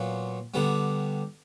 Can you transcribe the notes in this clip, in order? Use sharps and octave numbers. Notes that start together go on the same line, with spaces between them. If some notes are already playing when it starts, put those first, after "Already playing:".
Already playing: A#2 F#3 B3
D3 G3 B3